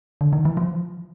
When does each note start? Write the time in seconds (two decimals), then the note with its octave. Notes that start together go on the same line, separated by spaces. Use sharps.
0.21 D3
0.33 D#3
0.45 E3
0.57 F3